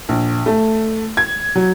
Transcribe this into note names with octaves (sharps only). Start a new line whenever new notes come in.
A#1
A3
G#6
F#3